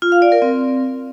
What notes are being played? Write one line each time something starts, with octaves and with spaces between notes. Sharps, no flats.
F4
F5
D5
A#4
C4